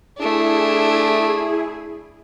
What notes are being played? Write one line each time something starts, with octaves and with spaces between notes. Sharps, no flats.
A3 D4 E4 G#4